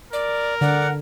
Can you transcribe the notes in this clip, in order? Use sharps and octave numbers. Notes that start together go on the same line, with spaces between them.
A#4 D5
D3 D5 F#5